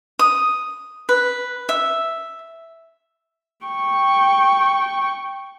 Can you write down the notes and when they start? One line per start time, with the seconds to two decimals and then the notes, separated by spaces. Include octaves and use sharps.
0.19 D#6
1.09 B4
1.69 E5
3.66 G5 C#6